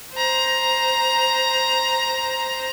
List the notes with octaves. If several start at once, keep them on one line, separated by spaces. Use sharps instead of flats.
C5 A#5